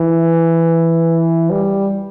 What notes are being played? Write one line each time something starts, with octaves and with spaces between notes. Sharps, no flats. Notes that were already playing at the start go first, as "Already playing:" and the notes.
Already playing: E3
G3